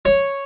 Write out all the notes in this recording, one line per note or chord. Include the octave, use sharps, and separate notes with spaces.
C#5